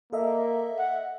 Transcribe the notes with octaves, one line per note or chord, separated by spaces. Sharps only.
A#3 A4 D#5 E5
F#5